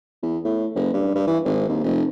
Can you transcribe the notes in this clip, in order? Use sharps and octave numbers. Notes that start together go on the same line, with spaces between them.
E2
A2
F#1
G2
G2
E3
G#1
D#2
F1